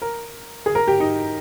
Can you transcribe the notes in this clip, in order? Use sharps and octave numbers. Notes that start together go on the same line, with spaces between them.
A#4
G#4
A#4
G4
D#4